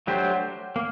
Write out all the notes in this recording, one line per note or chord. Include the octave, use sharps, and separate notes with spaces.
F#3 A3 D4 G4 C5
A#3